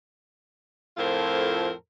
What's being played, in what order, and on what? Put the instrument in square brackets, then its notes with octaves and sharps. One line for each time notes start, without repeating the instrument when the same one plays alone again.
[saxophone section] F2 A2 F4 A4 A#4 C5